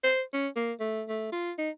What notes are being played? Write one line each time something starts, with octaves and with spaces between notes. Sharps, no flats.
C5
C#4
A#3
A3
A3
F4
D#4